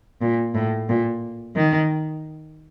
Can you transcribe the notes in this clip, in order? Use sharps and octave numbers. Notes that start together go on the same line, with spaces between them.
A#2
A2
A#2
D#3